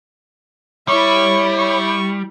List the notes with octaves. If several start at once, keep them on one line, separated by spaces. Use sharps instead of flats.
G3 E4 C#5 E5 C#6
C#6